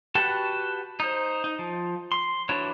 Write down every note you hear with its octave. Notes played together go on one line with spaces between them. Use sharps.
F#4 G4 B4 F#5 A5
D#4 C5
D#4
F3
C6
E3 D4 E4 F#4 C#5